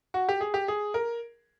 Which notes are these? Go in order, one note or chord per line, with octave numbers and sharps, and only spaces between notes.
F#4
G4
G#4
G4
G#4
A#4